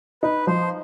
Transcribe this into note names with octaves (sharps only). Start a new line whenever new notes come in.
D#4 B4
F3 C5